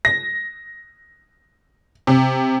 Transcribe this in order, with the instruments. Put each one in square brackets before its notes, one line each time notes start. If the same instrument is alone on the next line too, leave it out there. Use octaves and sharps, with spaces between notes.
[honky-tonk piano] A#6
C3